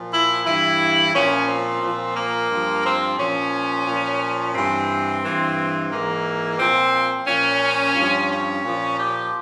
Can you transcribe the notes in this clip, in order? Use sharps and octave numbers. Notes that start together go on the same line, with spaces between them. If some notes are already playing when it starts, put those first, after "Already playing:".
Already playing: A#2 F3
E4
G2 E3 E4
A#2 F3 C#4
C4
A#2 F3
A#3
G2 F3
C4
A#2 F3 C#4
A#2 F3
G2 E3 C4
G2 E3
G#2 E3 A#3
A#2 F3 C4
A#2 F3 C#4
G2 F3
C#4
A#2 F3
G4